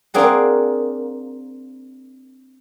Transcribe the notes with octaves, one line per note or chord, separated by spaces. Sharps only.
A#3 C4 D4 G#4 F#5